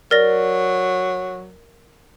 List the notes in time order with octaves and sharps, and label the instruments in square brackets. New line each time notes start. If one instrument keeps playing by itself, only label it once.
[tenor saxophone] F#3 [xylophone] A#4 D5 A#6